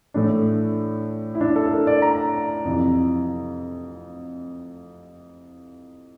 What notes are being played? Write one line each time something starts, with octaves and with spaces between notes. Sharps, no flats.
A2 E3 A3 D4
E4
D4
A4
A4
A#4
D5
A#5
F2 C3 E3